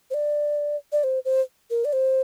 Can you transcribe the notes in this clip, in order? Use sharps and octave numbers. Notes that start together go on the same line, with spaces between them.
C5
D5
D5
C5
C5
A#4
D5
C5